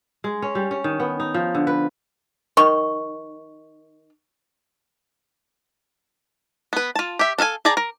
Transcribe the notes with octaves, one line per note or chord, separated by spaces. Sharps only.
G#3
C#4
G3
C#4
D#3
B3
D#4
F3
D3
B4
D#3 C#6
B3 B4
F4 A5
G4 E5
D4 A4 F5 G#5
G#4 D5 G5 A5 A#5
A#4